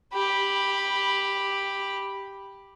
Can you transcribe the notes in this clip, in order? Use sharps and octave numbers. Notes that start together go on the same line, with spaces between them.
G4 B5